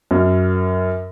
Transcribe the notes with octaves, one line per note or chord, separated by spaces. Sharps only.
F#2